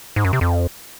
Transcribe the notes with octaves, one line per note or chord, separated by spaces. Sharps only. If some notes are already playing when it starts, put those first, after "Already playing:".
G#2
F#2
C3
F2